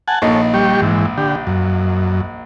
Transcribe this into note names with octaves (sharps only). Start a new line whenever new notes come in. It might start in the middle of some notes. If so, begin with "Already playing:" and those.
F#5 G#5 A5
A#1 D#4 A4 C#5
G3 G4 C#6
G#2 E3
D3 G4
F#2